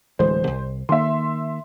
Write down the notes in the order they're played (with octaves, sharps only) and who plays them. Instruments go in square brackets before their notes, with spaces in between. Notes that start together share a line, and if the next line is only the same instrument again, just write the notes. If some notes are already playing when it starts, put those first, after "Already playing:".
[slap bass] D1 E3 G#3 [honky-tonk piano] C5
[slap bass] C2
[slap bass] D#3 A#3 [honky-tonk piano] E5 C6